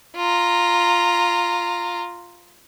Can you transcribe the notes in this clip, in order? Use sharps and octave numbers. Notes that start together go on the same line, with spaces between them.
F4 A#5